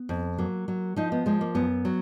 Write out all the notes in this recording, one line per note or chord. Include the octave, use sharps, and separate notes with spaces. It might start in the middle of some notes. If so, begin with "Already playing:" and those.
Already playing: B3
F2
F#3 A#3
F#3
F3 D#4
B3
F3 G#3
A#3
F#2 B3
F#3